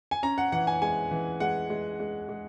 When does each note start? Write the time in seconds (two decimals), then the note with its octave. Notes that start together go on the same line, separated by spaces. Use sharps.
0.11 G#5
0.23 C#4 A#5
0.38 F#5
0.52 E3 F#5
0.67 G#5
0.82 G#3 G#5
1.11 E3
1.40 G#3 F#5
1.70 G#3
2.00 G#3
2.29 G#3